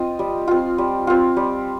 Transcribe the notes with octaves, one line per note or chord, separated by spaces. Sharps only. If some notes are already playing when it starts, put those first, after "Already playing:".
Already playing: C4 F4 D#5
G3
C4 F4
G3
C4 F4
G3